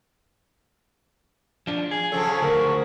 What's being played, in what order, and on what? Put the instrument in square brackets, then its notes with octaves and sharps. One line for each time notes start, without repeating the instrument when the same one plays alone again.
[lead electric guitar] F3 D4
G#4
[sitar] C#3 F3 F#3 [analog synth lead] A4
[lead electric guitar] D2 [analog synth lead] A#4